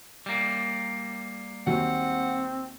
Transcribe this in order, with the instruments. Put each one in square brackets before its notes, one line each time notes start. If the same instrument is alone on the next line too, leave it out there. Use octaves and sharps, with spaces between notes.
[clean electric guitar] G3 A#3
[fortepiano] D#2 F#3 [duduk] C4 [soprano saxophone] F#5